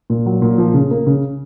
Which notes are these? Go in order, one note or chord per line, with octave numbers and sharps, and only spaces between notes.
A#2
F#3
A#2
F3
C#3
A#3
C#3